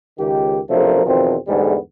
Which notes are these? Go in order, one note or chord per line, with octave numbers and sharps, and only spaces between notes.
C#2 D#3 G4
B1 C3 F3 A3 D4 A#4
E2 B2 D#3 F3 C4
E2 G#2 D3 G3 A3 B3